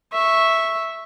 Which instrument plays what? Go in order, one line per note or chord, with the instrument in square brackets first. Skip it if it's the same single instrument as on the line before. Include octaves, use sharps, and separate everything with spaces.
[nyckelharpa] E5 C#6